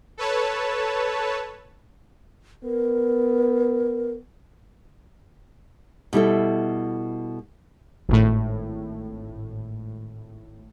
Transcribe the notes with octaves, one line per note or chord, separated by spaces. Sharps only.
A4 B4 C#5 A5
B3 A#4
B2 G3 E4 A4
G#1 A2